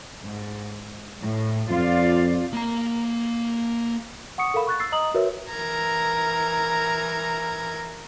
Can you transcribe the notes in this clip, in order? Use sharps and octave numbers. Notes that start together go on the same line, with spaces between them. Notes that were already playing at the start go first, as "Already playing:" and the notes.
G#2
A2
F2 F4 D5 F5
A#3 A#5
F#5 C#6 D#6 C#7
A4 A#4 F5 B5
C#6 F#6 A6
E6 A6 C7
D#5 A#5 D#6 F#7
F#4 A#4 B4 C#5 E5
E3 A#4 A#5 G#6